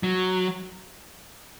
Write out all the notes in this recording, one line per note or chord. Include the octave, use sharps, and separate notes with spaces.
F#3